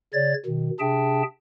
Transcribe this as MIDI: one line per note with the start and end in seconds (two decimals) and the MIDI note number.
0.13 0.34 49
0.13 0.34 73
0.13 0.34 74
0.13 0.34 93
0.46 0.70 47
0.46 0.70 51
0.80 1.23 48
0.80 1.23 62
0.80 1.23 68
0.80 1.23 76
0.80 1.23 79
0.80 1.23 81